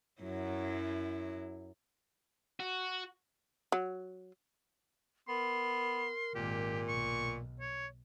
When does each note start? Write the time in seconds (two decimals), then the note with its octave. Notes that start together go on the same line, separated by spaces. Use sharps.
0.21 F#2 F#3 E4
2.60 F#4
3.72 F#3
5.28 B3 A#4 C6
6.35 G#1 A#2 G4
6.88 B1 C#6
7.60 C#5